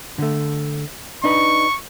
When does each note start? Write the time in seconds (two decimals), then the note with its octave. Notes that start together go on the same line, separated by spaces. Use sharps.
0.18 D3 A3
1.24 D4 D#4 B4 C#6